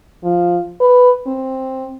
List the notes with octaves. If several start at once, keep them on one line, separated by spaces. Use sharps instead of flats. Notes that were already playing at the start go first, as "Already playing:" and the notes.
F3
B4
C4